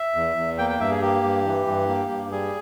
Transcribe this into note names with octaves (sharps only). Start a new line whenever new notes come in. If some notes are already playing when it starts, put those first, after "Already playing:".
Already playing: E5
E2
E2
A#3 G5
G5
G2 E5
G#4
A#3 G4
G2
E3
G2
A#3
G2
G3 G#4